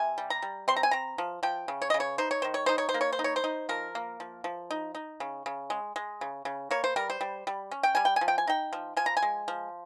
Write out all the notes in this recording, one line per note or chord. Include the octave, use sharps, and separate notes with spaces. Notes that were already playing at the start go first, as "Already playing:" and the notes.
Already playing: C3 G#5
G3
A#5
G3
C4 C6
A#5
G#5
C4 A#5
F3
F3 G5
C#3
C#5
C#3 D#5
C#5
D#4 C5
C#5
D#3 C5
C#5
D#4 C5
C#5
C5
A#3
C#5
C5
D#4
C#5
C5
D#4
F3 A#4
A#3
F3
F3
D#4
D#4
C#3
C#3
G#3
G#3
C#3
C#3
A#3 C#5
C5
G3 A#4
C5
G3
G3
C#4
G5
G3 G#5
G5
G#5
F3
G5
G#5
D#4 G5
F3
F3 G#5
A#5
G#5
G#3
F3